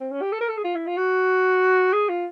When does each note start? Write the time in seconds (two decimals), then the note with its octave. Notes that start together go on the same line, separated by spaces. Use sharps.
0.01 C4
0.11 C#4
0.21 G4
0.32 A4
0.41 A#4
0.48 A4
0.57 G#4
0.64 F4
0.75 E4
0.87 F4
0.97 F#4
1.93 G#4
2.09 F4